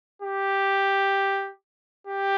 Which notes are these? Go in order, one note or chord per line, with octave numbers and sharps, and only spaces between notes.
G4
G4